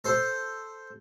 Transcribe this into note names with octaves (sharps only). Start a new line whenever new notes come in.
A4 C5